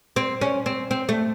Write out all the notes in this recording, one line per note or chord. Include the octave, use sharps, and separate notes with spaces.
C4
C#4
C4
C4
A3